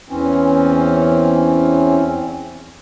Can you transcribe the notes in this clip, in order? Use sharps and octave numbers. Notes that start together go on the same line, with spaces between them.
E2 E3 C4 C#4